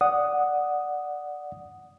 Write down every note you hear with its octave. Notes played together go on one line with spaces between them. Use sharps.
D5 F#5 D#6